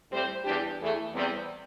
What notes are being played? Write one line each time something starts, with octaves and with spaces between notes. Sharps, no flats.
A2 G3 C4 G4 C5
E2 E3 G3 D4 G4
E2 E3 A3
E2 C3 G3